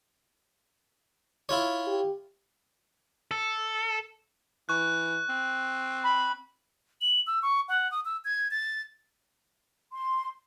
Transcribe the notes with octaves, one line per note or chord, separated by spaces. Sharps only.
E4 F4 C#5
G4
A4
E3 C#6 F#6
C4
B5
F#7
E6
C#6
F#5
D#6
E6
G#6
A6
C6